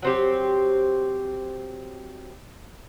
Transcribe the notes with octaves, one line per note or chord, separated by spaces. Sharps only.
F#3 C4 G4